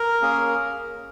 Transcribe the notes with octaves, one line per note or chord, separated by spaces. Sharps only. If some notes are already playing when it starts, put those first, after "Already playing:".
Already playing: A#4
A#3 C#4 G#4